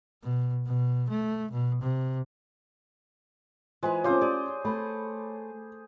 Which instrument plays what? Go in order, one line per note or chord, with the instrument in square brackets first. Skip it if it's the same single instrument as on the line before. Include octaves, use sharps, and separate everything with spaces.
[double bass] B2
B2
A3
B2
C3
[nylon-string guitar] E3 B4 [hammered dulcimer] G#3 [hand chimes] F4 C5 G#5
[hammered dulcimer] A3 C5 D6 [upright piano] C#4 F4 [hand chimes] C#5
[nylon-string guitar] G4 D5 [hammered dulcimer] G#4
[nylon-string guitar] A3 [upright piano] B5